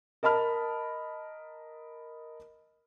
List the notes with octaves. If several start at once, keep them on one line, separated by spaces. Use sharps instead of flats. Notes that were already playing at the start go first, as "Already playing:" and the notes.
A#4 D#5 A5 B5 F6